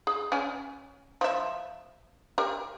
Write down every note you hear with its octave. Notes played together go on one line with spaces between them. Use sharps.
G#4
C#4 G#5
F3 E5
G4 A#4